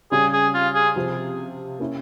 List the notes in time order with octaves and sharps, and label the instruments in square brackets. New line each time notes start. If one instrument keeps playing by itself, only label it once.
[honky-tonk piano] C#3 G3 C#4 G4 [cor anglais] G#4
[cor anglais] G#4
F4
G#4
[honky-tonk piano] C3 F3 C4
A#3 C#4 E4